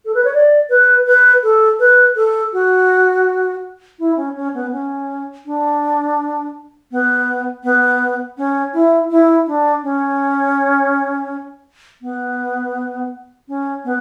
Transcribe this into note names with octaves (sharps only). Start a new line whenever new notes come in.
A4
B4
C#5
D5
B4
B4
A4
B4
A4
F#4
E4
C#4
C#4
B3
C#4
D4
B3
B3
C#4
E4
E4
D4
C#4
B3
C#4
B3